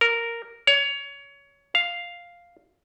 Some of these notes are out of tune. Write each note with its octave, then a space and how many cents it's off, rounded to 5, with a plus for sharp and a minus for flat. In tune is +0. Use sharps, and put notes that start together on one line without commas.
A#4 -5
C#5 +20
F5 +0